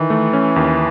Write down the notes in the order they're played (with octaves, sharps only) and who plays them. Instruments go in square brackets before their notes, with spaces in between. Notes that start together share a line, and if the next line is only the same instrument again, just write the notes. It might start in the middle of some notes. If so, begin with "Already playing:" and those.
Already playing: [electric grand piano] D#3 [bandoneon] E3
[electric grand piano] A3
C#4
D#2